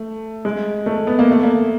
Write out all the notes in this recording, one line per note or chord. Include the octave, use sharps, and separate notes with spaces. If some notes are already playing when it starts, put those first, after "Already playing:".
Already playing: A3
G#3
A3
B3
A#3
A3
A#3